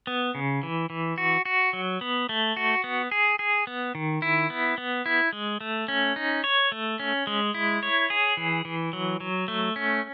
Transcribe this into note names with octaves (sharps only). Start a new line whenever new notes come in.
B3
C#3
E3
E3
F#4
F#4
F#3
B3
A3
F#4
B3
G#4
G#4
B3
D#3
E4
B3
B3
E4
G#3
A3
C#4
D#4
C#5
A3
C#4
G#3
E4
C#5
G#4
E3
E3
F#3
F#3
A3
C#4